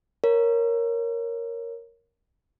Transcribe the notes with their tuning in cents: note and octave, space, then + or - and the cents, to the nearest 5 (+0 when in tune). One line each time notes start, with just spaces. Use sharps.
A#4 +0 C#5 +0